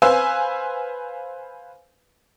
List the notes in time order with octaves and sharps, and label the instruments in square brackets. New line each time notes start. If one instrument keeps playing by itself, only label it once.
[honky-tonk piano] B4 C5 F5 G#5 E6